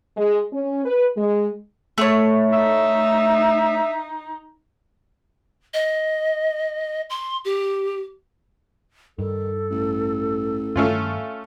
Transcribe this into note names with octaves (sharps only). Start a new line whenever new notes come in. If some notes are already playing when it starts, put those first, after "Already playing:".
G#3
C#4
B4
G#3
A3 C#5
D#4 E5
D#5
C6
G4
G2 D#3 A4
A1
G2 D#3 A3 C#4 F4